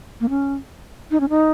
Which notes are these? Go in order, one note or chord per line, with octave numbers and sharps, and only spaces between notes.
A#3
C#4
D#4
C#4
D#4